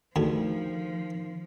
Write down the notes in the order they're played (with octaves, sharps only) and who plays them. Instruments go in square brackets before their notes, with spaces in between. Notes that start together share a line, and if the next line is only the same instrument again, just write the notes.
[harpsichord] D2 G2 G#4 [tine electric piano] D#3 [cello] F3